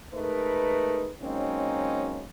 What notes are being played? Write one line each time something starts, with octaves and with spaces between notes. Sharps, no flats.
G#3 A3 D#4 A#4 B4
F#3 G#3 A#3 C4 C#4 D#4